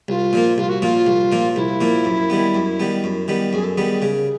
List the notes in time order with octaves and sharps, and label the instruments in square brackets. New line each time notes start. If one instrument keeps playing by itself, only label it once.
[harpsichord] C2 [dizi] F4
[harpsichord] A#2 F3 A#3
[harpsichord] C2 [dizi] F4
[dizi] F#4
F#4
[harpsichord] A#2 F3 A#3 [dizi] F4
[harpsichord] C2
A#2 F3 A#3
[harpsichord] C2 [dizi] E4
[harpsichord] A#2 F3 A#3
F#2
D#3 G3 B3
F#2
D#3 G3 B3
F#2
D#3 G3 B3
[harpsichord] F#2 [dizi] G#4
[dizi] A4
[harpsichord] D#3 G3 B3 [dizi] G#4
[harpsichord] C#3